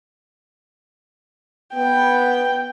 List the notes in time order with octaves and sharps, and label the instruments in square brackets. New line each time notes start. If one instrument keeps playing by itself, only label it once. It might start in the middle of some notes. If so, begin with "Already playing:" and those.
[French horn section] B3 [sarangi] G5